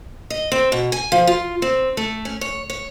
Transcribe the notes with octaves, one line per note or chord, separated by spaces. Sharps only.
D#5
C4
B2
G#5
F3
F4
C4
A3
C#4
C#5
C#5